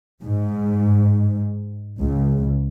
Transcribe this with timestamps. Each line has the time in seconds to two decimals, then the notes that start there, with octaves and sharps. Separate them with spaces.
0.22 G#2
2.00 C#2